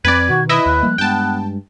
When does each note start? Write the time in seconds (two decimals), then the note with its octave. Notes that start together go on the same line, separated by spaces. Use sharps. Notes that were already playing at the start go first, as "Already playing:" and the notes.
0.05 F2 B3 C4 B4 D5 G#6
0.29 B2 D#3 F#4
0.49 E4 B4 D#5 E5 D#6
0.66 D#2 F#6
0.83 F3 G3 A#3
0.98 G2 G#3 B3 G5 A5